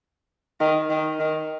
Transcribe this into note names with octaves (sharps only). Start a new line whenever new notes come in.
D#3
D#3
D#3